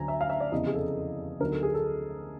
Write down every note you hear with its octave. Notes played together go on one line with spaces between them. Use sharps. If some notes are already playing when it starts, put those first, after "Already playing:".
Already playing: D2 D3 F#3 G#5 A#5
E5
F5
E5
D5
F1 E2 C#3 E3 D#5
G#4
A4
D2 D3 F#3 B3 D#4 A#4
A4
G#4
A4